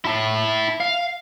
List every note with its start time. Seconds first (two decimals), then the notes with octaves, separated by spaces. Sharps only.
0.05 E4 A5
0.80 F5